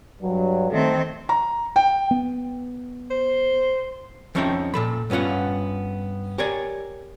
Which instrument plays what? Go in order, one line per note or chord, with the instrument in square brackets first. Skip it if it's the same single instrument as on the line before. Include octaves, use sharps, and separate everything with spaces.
[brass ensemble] G2 F#3
[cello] D#3 C4 [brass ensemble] A3
[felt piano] A#5
G5
[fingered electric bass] B3
[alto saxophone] C5
[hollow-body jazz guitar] F2 F3 C#4 D#4 E5 G5
A#2 A4 B5
G2 B3 C#4 F4 F#5
G4 A#4 C#5 D5 G#5